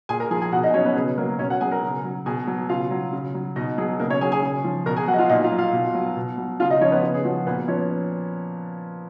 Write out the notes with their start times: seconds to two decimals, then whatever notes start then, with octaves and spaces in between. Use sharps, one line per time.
0.09 A#2 G#4 G#5
0.20 A#4 A#5
0.31 F3 G#4 G#5
0.41 G#4 G#5
0.52 B2 F#4 F#5
0.63 D#4 D#5
0.74 F#3 C#4 C#5
0.85 B3 B4
0.96 C#3 G#4
1.17 F#3 A#3 A#4
1.39 B2 C#4 C#5
1.50 F#4 F#5
1.61 F#3 G#4 G#5
1.72 A#4 A#5
1.83 C#3
2.04 F#3
2.26 B2 G#4 G#5
2.47 F#3
2.69 C#3 F4 F5
2.91 F#3
3.13 C#3
3.34 F#3
3.56 B2 D#4 D#5
3.78 F#3 G#4
3.99 C#3 A#3 A#4
4.10 C#4 C#5
4.21 F#3 G#4 G#5
4.32 G#4 G#5
4.43 C#3
4.64 F3
4.86 B2 A#4 A#5
4.96 G#4 G#5
5.08 F#3 F#4 F#5
5.13 D#5
5.19 F4 F5
5.29 A#2 D#4 D#5
5.44 F4 F5
5.52 F#3
5.58 F4 F5
5.73 B2
5.95 F#3
6.16 B2
6.38 F#3
6.60 C#3 F4 F5
6.70 D#4 D#5
6.81 F3 C#4 C#5
6.92 B3 B4
7.03 C#3
7.14 G#4
7.25 F3 F#4
7.46 A#2 B3 B4
7.68 F3 C#4 C#5